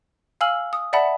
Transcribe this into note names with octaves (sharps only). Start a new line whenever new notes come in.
F5 G#5 E6 F6 F#7
D#6
D5 E5 F#5 A5 B5